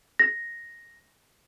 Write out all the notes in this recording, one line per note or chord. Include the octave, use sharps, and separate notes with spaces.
A#6